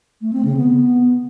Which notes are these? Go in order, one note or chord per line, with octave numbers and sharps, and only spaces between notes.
A3
C4
C#3
B3